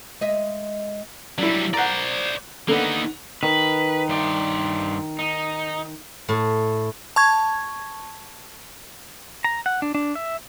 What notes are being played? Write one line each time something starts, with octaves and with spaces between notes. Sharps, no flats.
G#3 D#5 E5
F#3 G3 D4 E4
C5 D5 F#5 A#5
D3 A#3 B3 D#4
D#3 B4
G2 C5 D5
D#4
A2
A5 C#6 G#6
A#5
F#5
D4
D4
E5